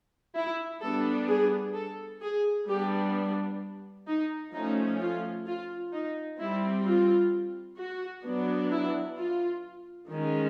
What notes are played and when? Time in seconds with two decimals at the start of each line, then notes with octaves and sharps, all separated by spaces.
0.36 E4
0.82 G3 B3 D4 A4
1.29 G#4
1.75 A4
2.22 G#4
2.68 G3 B3 D4 G4
4.07 D#4
4.53 F3 A3 C#4 D#4
5.00 F4
5.47 F4
5.93 D#4
6.39 G3 C4 E4
6.86 F4
7.79 F#4
8.25 F#3 B3 D4
8.71 E4
9.18 F4
10.11 D#3 G#3 C#4